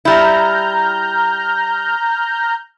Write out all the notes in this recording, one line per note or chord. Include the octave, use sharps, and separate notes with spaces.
G3 E4 A#5 F6 G6